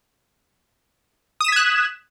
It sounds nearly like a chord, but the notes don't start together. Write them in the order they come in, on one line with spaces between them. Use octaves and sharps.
D#6 E7 B6 G#6 F#6